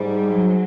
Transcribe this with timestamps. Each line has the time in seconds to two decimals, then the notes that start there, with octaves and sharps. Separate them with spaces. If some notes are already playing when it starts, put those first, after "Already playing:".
Already playing: G#2 G3
0.33 F#3